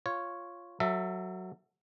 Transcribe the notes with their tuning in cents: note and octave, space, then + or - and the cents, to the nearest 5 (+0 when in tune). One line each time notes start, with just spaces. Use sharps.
F4 +0 C#5 +0
F#3 +0 A4 +35 E5 +0